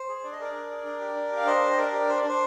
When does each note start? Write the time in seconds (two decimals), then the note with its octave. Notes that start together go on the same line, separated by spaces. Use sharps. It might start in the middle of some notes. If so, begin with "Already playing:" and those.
Already playing: C5
0.09 G#4
0.24 D4 D5
0.32 D#5
0.40 G#4 A#4 D5
0.55 D4
0.70 G#4
0.85 D4
1.00 G4
1.16 D4
1.32 G4 F5
1.46 D4 C5 D#5
1.62 G4
1.73 D#5
1.78 D4 A#4 D5
1.93 G4
2.09 D4 C5
2.18 D5
2.24 D4 C5